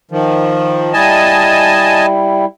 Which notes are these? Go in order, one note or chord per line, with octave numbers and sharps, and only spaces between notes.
D#3 F3
G3 E4 D#5 G#5 A5